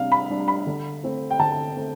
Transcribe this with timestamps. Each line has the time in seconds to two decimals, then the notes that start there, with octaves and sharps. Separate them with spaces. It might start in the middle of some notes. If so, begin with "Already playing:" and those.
Already playing: C3 G3 D4 F5
0.12 B5
0.30 G3 D4
0.48 B5
0.67 D3
1.04 A3 C4
1.31 G5
1.39 D3 A5
1.77 A3 C4